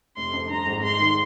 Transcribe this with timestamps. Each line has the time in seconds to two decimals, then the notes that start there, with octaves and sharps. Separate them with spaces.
0.17 F1 C6
0.33 F2
0.49 G2 A#5
0.66 G#1
0.83 G#3 C6
0.99 D#3